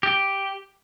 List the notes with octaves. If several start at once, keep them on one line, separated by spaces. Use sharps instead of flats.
G4